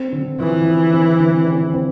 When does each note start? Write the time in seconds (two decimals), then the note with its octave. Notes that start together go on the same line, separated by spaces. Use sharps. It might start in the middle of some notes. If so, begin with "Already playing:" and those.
Already playing: C4
0.12 D3
0.40 E3 F3
0.66 C4
0.93 C4
1.20 D3
1.47 C4
1.74 C4